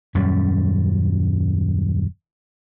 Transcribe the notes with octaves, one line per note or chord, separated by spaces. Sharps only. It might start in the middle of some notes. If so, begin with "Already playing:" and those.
D#1 F#2 G3 C#4